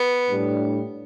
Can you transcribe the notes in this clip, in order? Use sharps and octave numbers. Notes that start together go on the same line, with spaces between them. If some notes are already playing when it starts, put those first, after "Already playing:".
Already playing: B3
A2 G3 D4